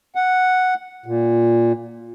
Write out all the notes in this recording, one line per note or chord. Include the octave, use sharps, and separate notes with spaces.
F#5
A#2